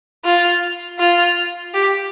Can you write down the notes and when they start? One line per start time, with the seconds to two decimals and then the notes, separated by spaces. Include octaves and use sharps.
0.25 F4
0.99 F4
1.74 G4